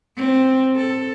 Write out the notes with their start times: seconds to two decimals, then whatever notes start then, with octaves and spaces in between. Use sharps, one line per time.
0.17 C4
0.76 A4